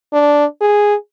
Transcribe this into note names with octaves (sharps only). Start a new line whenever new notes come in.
D4
G#4